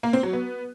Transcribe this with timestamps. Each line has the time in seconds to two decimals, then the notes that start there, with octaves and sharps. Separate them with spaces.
0.03 A#3
0.13 C4
0.23 F#3
0.33 B3